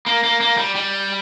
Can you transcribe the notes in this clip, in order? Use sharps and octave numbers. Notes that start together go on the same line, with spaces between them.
A#3
A#3
A#3
G3
G3